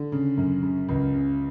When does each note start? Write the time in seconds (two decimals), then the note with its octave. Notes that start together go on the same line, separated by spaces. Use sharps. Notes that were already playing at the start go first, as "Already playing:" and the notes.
Already playing: D3
0.12 C#3
0.37 F#2
0.63 C#3
0.89 C#2
1.14 C#3